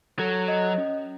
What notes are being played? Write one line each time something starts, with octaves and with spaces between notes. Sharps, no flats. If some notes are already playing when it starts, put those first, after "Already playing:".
F#3 A4
D#5
C#4